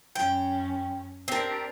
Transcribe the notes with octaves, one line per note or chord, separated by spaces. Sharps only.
F#2 C#4 G5
C4 D4 G4 A#4